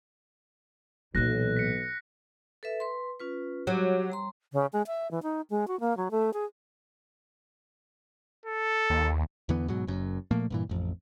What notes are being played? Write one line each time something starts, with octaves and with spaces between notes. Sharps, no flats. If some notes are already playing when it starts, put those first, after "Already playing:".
B1 A#2 E3 F#6 A#6
B6 C#7
A4 B4 E5
B4 C6
C#4 F4 B4
F#3 G4 D6
G3 A#5 C6
C#3
G#3
E5
E3
D#4
G#3
F#4
A#3
F#3
A3
G#4
A4
D#2
E2 D3 E3 B3
G#2 B2 F#3
F#1 F#2
A#2 F3 A3 A#3
G2 A#2 E3
A1 F2